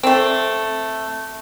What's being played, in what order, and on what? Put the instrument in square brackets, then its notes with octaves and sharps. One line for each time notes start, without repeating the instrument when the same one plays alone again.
[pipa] A3 C4